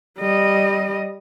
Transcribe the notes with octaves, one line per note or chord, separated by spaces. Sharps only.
G3 D#5